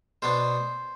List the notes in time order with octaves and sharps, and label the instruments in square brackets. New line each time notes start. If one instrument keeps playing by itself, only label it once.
[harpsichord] B2 B3 D4 C5